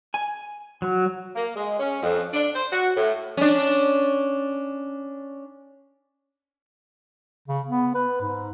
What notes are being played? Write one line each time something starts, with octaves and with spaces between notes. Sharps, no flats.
G#5
F#3
A#3
G#3
C#4
F2
D4
C5
F#4
A2
C#4 D4
C#3
B3
B4
G#2